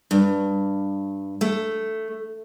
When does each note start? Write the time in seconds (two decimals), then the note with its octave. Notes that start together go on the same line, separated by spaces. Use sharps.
0.11 G2
1.41 A3